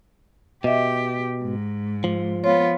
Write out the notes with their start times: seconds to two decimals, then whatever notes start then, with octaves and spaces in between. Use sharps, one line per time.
0.64 B2 G4 D#5 E5
1.42 G#2
2.04 F3
2.44 B3 F4 C#5